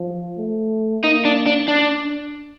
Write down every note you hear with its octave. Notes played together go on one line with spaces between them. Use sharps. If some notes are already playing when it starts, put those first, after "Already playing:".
Already playing: F3
A3
A#3 D#4
D4
D4
D4